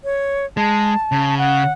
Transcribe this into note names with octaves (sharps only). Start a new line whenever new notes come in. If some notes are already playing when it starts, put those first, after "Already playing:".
C#5
G#3 A5
C#3
F#5